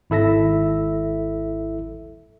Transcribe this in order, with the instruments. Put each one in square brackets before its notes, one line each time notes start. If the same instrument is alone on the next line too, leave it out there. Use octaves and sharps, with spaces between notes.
[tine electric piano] G#1 E4 A4 E5 A#6